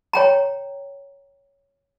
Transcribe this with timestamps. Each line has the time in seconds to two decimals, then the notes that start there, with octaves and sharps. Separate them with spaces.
0.13 C#5 G5 A#5